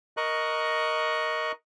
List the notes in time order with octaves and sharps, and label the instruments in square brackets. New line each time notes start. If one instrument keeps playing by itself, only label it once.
[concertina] A#4 D#5 C#6 F#6